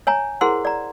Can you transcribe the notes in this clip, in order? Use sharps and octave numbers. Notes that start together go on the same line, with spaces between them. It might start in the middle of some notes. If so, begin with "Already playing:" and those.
C#5 G#5 A#5
E4 G#4 A#4 C5 F#5 C6
D5 A#5